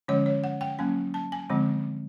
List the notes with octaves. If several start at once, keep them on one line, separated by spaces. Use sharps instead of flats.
D3 F3 G#3 C#4 C#5
C#5
F#5
G5
F#3 A#3 C#4 G#5
A5
G#5
D3 F3 G#3 C4